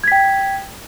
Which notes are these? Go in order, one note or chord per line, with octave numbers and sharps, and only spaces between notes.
G5 G#6 B6